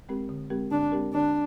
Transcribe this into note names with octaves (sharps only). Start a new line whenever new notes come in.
G#3 C4 G4 A#4
D3
G#3 C4 G4 A#4
D3 D4
G#3 C4 G4 A#4
D3 D4